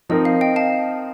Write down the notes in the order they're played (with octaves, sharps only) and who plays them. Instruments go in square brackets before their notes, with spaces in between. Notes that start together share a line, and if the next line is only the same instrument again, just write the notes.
[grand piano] F3 C4 D#4 A#4 [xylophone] D#5
[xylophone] F5
D#5 G5
F5 A5